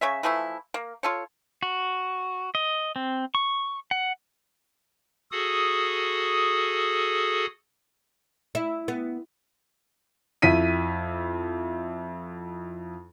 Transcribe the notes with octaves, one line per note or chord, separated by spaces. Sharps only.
C#3 C#5 E5
E3 F3 A3 E4
A#3
F4 A4 C#5
F#4
D#5
C4
C#6
F#5
F#4 G#4 A4 D#6
E4
B3
F2 E4 B6 D#7